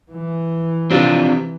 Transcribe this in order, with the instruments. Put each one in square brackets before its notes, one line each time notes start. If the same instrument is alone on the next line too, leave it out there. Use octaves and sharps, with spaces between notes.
[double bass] E3
[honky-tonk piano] C3 F3 [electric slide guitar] C4 D4 F4